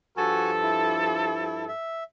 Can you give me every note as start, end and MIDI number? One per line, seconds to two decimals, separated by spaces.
0.17 1.71 43
0.17 1.71 53
0.17 0.51 66
0.17 1.71 69
0.17 0.51 80
0.63 1.64 64
1.69 2.04 76